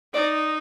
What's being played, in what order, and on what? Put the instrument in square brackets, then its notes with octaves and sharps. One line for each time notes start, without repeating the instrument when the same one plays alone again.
[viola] D#4 [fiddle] D5